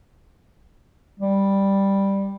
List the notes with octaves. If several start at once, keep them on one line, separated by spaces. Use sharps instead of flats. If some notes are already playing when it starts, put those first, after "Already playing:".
G3